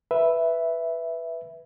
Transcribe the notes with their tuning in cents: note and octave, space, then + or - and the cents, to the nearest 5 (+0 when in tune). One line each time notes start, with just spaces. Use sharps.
B4 +0 E5 +0